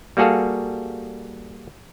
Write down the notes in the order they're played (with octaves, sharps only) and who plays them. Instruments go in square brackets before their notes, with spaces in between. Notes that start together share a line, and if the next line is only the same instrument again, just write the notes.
[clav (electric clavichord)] G3 A#3 F#4 G#4 A4 F5